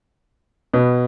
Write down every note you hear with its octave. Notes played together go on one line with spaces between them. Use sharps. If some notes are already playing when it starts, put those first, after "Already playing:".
B2 B3